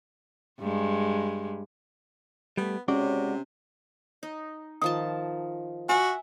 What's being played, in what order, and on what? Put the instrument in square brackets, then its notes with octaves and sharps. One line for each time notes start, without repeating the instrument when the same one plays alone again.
[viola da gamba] G2 G#3
[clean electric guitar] G3 A3 [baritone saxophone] B3
[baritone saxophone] C3 [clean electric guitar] G#3 F#4 D5 [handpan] C#4
[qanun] D#4
[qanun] D#3 F3 A5 [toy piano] D#6
[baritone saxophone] F#4 [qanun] E5 F#5 [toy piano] G#5